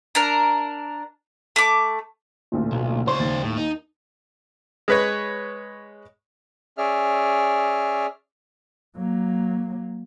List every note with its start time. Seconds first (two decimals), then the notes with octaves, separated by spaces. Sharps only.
0.15 D4 A#4
1.56 A3 D6
2.52 A1 D2 A#2
2.72 B1
3.07 C#2 C5 C#5 C6
3.19 D#2 A6
3.44 A2
3.58 D#4
4.88 G#3 B4 C#5
6.78 C#4 G#4 D5 E5 F6
8.97 F#3 A#3